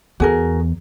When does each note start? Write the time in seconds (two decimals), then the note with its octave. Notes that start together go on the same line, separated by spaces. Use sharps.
0.20 E2 F#4 G#4 A#4